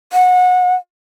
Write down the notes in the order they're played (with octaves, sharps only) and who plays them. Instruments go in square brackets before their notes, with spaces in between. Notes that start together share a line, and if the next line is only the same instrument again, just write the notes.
[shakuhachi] F#5